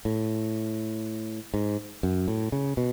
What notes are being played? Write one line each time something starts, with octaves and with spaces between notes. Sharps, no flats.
A2
G#2
F#2
A2
C#3
B2